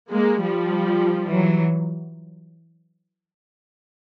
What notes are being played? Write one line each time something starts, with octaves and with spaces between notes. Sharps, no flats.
G#3 A#3
F3 G3
E3 F#3